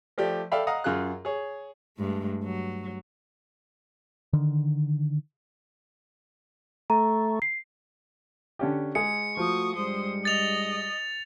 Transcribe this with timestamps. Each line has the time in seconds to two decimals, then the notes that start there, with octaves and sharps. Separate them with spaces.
0.18 F3 A3 G4 D5
0.52 A4 D5 E5 F5 G5 B5
0.67 D#5 F5 F#5 A#5 D#6
0.84 F#2 F4 G#4 F#6
1.25 G#4 C#5
1.97 G2 G#3 A3
2.44 F#3
4.33 D3 D#3
6.90 A3 A#5
7.42 C7
8.59 D3 C#4 G4
8.95 G#3 G#4 C#7
9.37 F3 A3 F#4 C#6 D#6
9.76 G2 G3 G#3 C5 D#6
10.25 D#5 A6 F7